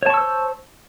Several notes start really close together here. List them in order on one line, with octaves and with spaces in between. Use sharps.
C#5 A5 C#6 E6 C5